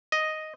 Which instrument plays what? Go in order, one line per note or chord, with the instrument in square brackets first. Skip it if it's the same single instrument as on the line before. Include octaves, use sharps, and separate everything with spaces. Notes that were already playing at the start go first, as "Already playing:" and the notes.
[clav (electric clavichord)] D#5